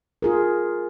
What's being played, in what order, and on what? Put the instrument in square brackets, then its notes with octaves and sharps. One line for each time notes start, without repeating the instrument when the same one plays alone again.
[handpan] F4 G#4 A#4